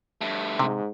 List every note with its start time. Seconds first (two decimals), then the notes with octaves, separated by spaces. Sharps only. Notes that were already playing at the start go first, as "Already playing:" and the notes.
0.21 G2 A3
0.59 G#2 C3